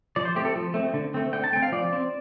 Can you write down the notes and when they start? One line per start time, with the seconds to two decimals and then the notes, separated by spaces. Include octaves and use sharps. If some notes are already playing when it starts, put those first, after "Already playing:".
0.16 F3 D5
0.25 C5
0.35 A3 C4 G4
0.45 A4
0.56 F3
0.74 A3 C4
0.94 D3
1.14 A3 C4
1.33 D3 G5
1.44 A5
1.52 A3 G5
1.56 C4
1.63 F5
1.72 F3 D5
1.93 C4